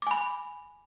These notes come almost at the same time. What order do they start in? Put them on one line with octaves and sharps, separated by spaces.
D6 G#5 B5